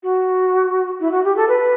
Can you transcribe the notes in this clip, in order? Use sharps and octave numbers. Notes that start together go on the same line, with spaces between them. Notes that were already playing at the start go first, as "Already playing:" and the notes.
F#4
E4
F#4
G4
A4
B4